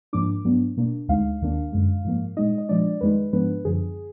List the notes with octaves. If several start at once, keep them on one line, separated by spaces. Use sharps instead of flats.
G#2 F3 A#3 D4 D6
G#2 F#3 B3 D4
B2 A#3 D4
D2 D3 G#3 D#4 F5
D#2 D#3 A#3 D4
F#2 D3 G#3
G#2 F3 A#3
A#2 G#3 D#4 D#5
D#5
A#2 F3 G#3 D4 D5
F2 D#3 G#3 D#4 B4
G#2 F3 G#3 B3 D4 B4
F#2 D3 F3 G#4